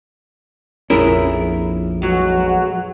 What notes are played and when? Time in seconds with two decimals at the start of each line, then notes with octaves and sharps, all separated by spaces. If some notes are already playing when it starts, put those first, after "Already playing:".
0.90 A#1 F2 C#4 E4 G#4 A#4
2.03 B1 F#3 G#3 F#4